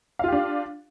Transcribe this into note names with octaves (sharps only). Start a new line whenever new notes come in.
D4 F4 G4 F5